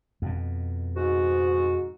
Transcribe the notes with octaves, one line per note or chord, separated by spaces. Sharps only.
F2 B2
G#2 F#4